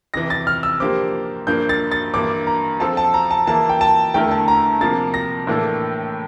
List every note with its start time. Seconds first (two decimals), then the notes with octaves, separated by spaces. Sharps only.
0.14 F2 C3 E3 A#6
0.30 A6
0.47 F6
0.63 E6
0.80 F3 A#3 D4 G4 C5 D6
1.47 G2 F3 A#3 D4 G6
1.69 A6
1.91 A6
2.14 G2 E3 A#3 D6
2.47 A#5
2.80 F3 C4 F4 A4 C5 A5
2.97 A5
3.14 A#5
3.31 A5
3.47 E3 A#3 E4 A5
3.69 G5
3.81 A5
4.14 E2 D3 A3 E4 A#4 G5
4.31 A5
4.48 A#5
4.81 C3 F3 A#3 A6
5.14 A#6
5.47 A2 E3 A#3 D4 A4